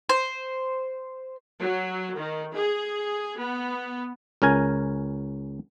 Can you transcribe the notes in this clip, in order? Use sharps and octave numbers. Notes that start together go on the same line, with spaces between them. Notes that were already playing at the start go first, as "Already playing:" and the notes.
C5
F#3
D#3
G#4
B3
C#2 C#4 A#4 G#5